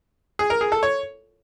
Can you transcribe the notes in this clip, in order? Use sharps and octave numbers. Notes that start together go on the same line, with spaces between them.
G#4
A#4
G#4
A4
C#5